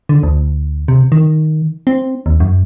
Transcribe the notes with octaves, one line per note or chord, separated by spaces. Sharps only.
D3
D2
C3
D#3
C4
D#2
F#2